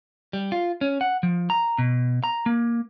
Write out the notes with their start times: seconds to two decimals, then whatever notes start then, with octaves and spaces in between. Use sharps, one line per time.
0.33 G3
0.52 F4
0.81 C#4
1.01 F#5
1.23 F3
1.50 A#5
1.78 B2
2.24 A#5
2.46 A#3